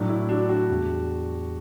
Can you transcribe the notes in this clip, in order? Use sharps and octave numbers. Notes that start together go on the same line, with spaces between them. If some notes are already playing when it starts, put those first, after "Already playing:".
Already playing: A2 F#3 D4
E4
D4 F#4
D4 F#4
E2 D3 G3